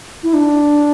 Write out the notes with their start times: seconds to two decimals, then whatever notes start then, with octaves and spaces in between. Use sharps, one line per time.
0.23 E4
0.34 D4